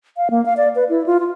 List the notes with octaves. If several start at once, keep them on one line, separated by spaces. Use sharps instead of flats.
F5
A#3
F5
D5
B4
E4
F4
F4